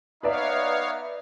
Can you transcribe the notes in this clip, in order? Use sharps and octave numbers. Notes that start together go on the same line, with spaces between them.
B3 D#4 B4 C#5 D5 E5 F5